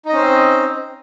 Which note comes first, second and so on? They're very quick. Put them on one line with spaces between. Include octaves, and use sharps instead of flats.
D#4 D#5 C#4 C5 C4